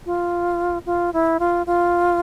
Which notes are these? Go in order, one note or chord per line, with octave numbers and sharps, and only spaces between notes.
F4
F4
E4
F4
F4